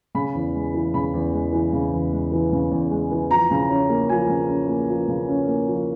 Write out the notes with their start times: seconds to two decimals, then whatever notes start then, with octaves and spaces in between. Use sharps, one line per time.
0.15 C#3 B5
0.35 E2
0.55 G#3
0.74 E3
0.94 C#3 B5
1.14 E2
1.34 G#3
1.52 E3
1.73 C#3
1.92 E2
2.12 G#3
2.32 E3
2.52 C#3
2.71 E2
2.91 G#3
3.11 E3
3.30 F3 A#5
3.51 C#3
3.70 C#4
3.90 A#3
4.09 F3 G#5
4.29 C#3
4.49 C#4
4.68 A#3
4.89 F3
5.08 C#3
5.28 C#4
5.48 A#3
5.67 F3